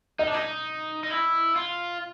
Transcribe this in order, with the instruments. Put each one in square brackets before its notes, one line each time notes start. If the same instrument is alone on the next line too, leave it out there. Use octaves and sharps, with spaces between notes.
[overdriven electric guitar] D#4 [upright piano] D#5
[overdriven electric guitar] D4
D#4
D#4
E4
F4